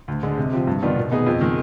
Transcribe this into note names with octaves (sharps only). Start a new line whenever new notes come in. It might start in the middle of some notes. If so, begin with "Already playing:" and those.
D2
D3 G#3
C3
F3 C4 G4
G2
D#3 B3 D4 F4
B2
B3 D#4 G#4
F2
D#3 G#3